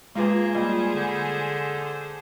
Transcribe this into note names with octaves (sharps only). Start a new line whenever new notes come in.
G#3 A#3 F4 G#4 B4 C5
G3 A#3 F4 D#5
D3